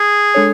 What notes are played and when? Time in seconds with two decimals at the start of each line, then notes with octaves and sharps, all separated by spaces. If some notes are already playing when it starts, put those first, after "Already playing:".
Already playing: G#4
0.34 G#3 D4 A4 C#5